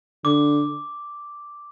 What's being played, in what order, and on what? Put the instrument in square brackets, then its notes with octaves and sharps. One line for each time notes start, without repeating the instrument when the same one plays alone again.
[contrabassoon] D3 [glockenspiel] D6